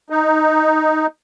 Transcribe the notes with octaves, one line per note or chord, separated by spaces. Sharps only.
D#4